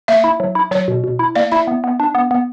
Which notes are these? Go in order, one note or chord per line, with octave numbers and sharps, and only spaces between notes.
A#3 E5
E4
F#3
E4
F#3 C#5
B2
B2
E4
A#3 D5
E4 E5
B3
B3
D4
B3
B3